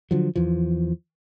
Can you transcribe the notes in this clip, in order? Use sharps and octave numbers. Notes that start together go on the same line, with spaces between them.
D3 F3 F#3
E2 E3 F3